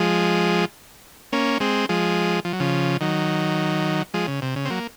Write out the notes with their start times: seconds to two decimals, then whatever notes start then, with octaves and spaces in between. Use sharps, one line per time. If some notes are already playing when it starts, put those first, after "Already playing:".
Already playing: F3 G#3
1.33 A#3 C#4
1.60 G#3 C4
1.89 F3 G#3
2.45 F3
2.53 F#3
2.60 C#3 F3
3.01 D#3 F#3
4.14 F3 G#3
4.27 C#3
4.42 C3
4.56 C#3
4.65 C4
4.70 F#3 A#3